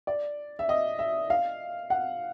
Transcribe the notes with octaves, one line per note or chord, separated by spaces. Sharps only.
D5
E5
D#5
E5
F5
F#5